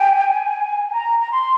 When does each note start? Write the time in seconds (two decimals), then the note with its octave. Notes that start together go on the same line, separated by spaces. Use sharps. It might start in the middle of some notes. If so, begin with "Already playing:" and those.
Already playing: G5 G#5
0.88 G#5
0.93 A#5
1.19 A#5
1.32 C6